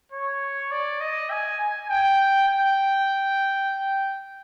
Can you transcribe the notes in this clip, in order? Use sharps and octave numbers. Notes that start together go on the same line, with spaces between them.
C#5
D5
D#5
G#5
G#5
G5
G5